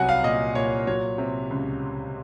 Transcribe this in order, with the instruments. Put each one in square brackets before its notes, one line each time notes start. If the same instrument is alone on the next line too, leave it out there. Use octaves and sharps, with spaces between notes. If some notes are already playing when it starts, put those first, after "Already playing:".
Already playing: [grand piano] C2 F#3 F#5 G#5
F5
A#2 D#5
A#2 C#5
F#3 C#5
C3
C#2